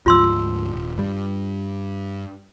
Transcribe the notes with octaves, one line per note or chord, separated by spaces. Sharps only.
D2 G#2 F3 F4 C6 E6
D#1
G2 G3